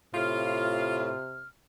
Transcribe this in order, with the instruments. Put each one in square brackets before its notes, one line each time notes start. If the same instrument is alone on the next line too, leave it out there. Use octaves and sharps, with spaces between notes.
[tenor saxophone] A2 [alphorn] C3 [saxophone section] F4 [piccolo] F6